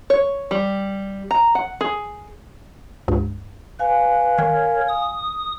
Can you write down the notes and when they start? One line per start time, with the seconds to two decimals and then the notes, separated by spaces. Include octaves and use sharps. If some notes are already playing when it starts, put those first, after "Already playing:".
0.10 C#5
0.51 G3
1.31 A#5
1.55 F#5
1.81 G#4
3.08 C#2 G2
3.79 B4 F5 G#5
4.39 D#3 A#4 C#5
4.88 D#6